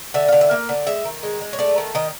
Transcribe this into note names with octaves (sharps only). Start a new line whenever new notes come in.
D3 E5
D3 F5
E5
A#3
D3
G#3 E5
D#3
G#3
G#3
C#5
A3 D5
D#3
D#3 D#5